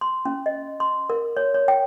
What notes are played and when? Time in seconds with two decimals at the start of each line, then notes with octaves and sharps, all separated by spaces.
0.01 C6
0.25 C#4
0.46 D#5
0.80 C6
1.10 A#4
1.37 C#5
1.54 C#5
1.68 G5